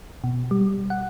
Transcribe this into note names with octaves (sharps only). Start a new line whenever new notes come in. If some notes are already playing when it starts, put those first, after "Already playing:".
B2
G3
F#5